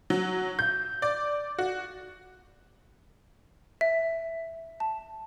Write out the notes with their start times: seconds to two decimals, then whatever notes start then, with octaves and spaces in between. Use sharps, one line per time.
0.10 F#3
0.59 G6
1.02 D5
1.58 F#4
3.81 E5
4.80 A5